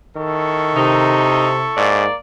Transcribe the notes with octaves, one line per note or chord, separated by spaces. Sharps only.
D#3 E4 A4 C#6
C3 D#4
G#2 A#3 D5